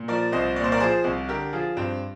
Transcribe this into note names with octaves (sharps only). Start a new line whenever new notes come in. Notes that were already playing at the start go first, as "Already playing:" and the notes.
Already playing: A#2
F3 A#4 D5
C2 C5 D#5
A#2 D5
C5
A#4 D5
F3 G#4 C5
C2
D3 G4 A#4
F3 F4 G#4
G2 C4